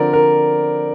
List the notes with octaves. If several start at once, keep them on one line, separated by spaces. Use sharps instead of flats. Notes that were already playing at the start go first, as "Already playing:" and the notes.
Already playing: D3 F3 C4 A#4 D5
A#4